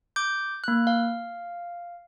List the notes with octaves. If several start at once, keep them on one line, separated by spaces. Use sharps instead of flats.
D6 G6
A#3 F#6
F5